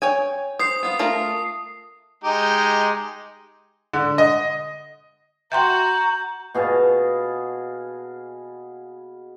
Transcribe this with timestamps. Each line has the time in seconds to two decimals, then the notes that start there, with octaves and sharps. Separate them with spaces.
0.02 C#5 G5 G#5
0.59 C5 D#6 C7
0.83 B3 F4
0.99 A3 F4 A#4
2.24 G#3 D#4 G4
3.93 D3
4.18 D#5
5.52 F#4 E5 G5 A#5 C6 G6
6.54 B2 G#4 F5 A5